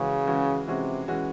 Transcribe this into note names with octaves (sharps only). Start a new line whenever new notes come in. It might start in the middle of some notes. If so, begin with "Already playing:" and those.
Already playing: C#3 E3 G#3 C#4 F#4
E3 G#3 C#4 F#4
C3 E3 G#3 C#4 F#4
E3 G#3 C#4 F#4